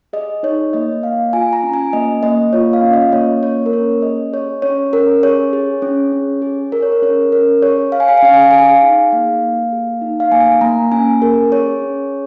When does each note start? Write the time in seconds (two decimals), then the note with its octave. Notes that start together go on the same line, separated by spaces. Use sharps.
0.13 G#4 D#5
0.43 D#4 C#5
0.73 A#3 D#5
1.03 A#3 F5
1.33 F4 G#5
1.53 A#5
1.63 C#4
1.73 G#5
1.93 A#3 D#5
2.23 A#3 D#5
2.53 F4 C#5
2.73 F5
2.83 C#4
2.93 D#5
3.13 A#3 C#5
3.43 A#3 C#5
3.66 A#4
3.72 C#4 C#5
4.02 G#4 D#5
4.33 G#4 C#5
4.62 C#4 C#5
4.93 C#4 A#4
5.23 G#4 C#5
5.53 G#4
5.82 C#4
6.12 C#4
6.42 G#4
6.72 G#4 A#4
6.82 C#5
6.92 A#4
7.02 C#4 C#5
7.32 C#4 A#4
7.62 G#4 C#5
7.92 G#4 F5
8.00 G#5
8.08 F5
8.18 G#5
8.22 C#4 F5
8.34 G#5
8.42 F5
8.51 G#4 G#5
8.59 F5
8.82 D#4
9.12 A#3 F5
9.42 A#3
9.72 G#4
10.01 D#4
10.20 F5
10.32 A#3 G#5
10.61 A#3 A#5
10.92 C#4 G#5
11.22 G#4 A#4
11.52 G#4 C#5
11.82 C#4